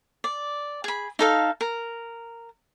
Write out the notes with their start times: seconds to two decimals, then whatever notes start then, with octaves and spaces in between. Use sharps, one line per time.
0.24 D5
0.84 G#4 B5
1.19 D#4 A4 F5
1.61 A#4